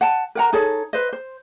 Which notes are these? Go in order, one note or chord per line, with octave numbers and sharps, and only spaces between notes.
F#5 A5
A#4 F#5 A#5
D#4 G#4 A4 C#5
B4 C5 D#5
C5